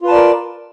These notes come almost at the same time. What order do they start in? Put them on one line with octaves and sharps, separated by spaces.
F4 B4 A5 D5 A#4